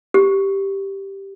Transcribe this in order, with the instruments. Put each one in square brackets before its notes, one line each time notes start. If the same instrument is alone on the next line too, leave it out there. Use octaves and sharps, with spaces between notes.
[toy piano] G4